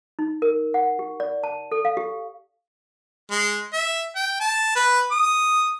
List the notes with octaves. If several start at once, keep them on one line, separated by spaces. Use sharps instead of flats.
D#4
A#4
F#5
G4
D5
A5
A4
F5
G4
G#3
E5
G5
A5
B4
D#6